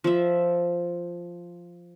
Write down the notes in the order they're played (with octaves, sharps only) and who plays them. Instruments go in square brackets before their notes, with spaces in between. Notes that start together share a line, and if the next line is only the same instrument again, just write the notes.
[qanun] F3 E5